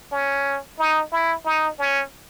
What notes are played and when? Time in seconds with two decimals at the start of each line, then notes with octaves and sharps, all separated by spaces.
0.12 C#4
0.79 D#4
1.12 E4
1.45 D#4
1.79 C#4